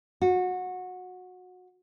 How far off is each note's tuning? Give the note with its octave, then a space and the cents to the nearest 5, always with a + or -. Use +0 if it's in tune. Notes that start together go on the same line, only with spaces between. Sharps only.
F#4 -20